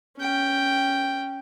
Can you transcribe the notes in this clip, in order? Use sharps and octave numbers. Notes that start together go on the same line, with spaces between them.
C#4 G5